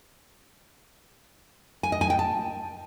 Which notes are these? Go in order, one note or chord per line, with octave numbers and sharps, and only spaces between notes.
G#5
D#5
G#5
G5
A5